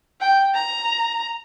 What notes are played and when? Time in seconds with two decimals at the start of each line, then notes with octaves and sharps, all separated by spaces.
0.21 G5
0.54 A#5